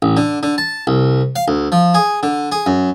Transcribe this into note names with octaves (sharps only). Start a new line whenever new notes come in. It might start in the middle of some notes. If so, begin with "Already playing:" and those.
A1
D3
D3
A5
C2
F5
D2
F3
G#4
D3
G#4
F#2